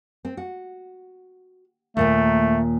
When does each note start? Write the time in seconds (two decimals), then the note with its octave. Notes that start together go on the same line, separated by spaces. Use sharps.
0.25 C4
0.37 F#4
1.97 D#2 A#2 A3 A#3